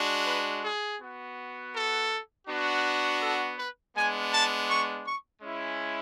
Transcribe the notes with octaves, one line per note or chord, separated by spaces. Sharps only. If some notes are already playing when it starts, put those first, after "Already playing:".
Already playing: G#3 D4 F#4
B4
G#4
B3 F#4
A4
B3 D4 F#4
A4
B4
G#3 B3 D4 G#5
A5
C#6
C#6
G#3 C#4 E4